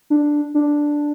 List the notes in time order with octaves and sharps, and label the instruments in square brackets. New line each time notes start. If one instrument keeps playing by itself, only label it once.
[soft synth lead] D4
D4